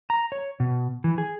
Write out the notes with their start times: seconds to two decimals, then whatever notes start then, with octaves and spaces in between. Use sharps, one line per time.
0.10 A#5
0.32 C#5
0.60 B2
1.04 E3
1.18 G#4